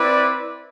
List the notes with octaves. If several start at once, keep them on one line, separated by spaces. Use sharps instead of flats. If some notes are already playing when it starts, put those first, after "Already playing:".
Already playing: C4 E4 B4 D5